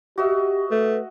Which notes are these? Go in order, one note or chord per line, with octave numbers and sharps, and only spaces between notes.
F#4 G4 D#5 E5
A3 B4